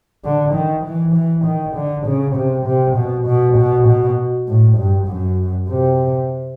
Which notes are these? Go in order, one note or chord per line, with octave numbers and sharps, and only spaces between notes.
D3
D#3
E3
E3
D#3
D3
C#3
C3
C3
B2
B2
B2
B2
A2
G2
F#2
C3